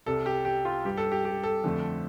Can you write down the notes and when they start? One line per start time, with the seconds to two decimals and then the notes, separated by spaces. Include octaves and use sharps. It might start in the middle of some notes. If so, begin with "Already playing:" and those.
0.06 C2 C3 G3 A4
0.26 G4
0.45 G4
0.65 F4
0.85 G2 G3 G4
0.97 A4
1.12 G4
1.25 G4
1.43 A4
1.64 F2 D3 F3 A3